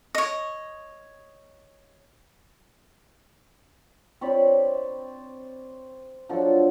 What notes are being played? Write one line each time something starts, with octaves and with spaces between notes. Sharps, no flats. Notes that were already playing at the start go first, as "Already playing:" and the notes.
C#5 D#5
C4 C#5 D5 B5
F3 F#3 D4 A4